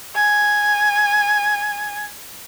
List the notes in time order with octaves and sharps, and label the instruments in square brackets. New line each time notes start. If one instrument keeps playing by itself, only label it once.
[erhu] G#5